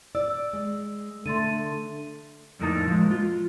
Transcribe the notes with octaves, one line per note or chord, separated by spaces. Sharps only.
D5 E6
G#3
D3 A3 C6 A6 D#7
F2 A2 D3 A#3 D#4 A5
F3 G#3
F4